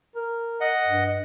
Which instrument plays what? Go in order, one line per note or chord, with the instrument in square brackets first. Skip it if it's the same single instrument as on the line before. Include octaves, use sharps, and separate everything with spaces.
[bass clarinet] A#4
[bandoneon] D#5 F#5
[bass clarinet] G2